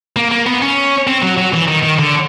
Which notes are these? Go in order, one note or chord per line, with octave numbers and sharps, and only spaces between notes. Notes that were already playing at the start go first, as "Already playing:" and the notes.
A#3
A#3
B3
C#4
C4
F#3
F#3
E3
D#3
D#3
D3